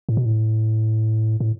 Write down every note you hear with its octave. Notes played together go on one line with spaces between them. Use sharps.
A2
B2
A2
A2